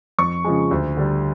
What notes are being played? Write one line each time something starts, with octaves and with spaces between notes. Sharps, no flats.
F2 C#6
C#3 F3 G#3
D2
D3 G3